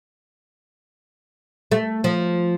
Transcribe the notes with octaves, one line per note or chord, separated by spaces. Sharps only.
A3
F3